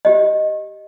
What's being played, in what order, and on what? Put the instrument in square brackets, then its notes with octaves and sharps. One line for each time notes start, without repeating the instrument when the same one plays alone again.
[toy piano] G4 D#5